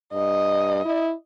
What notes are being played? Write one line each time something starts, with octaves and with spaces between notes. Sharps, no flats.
G2 D#5
E4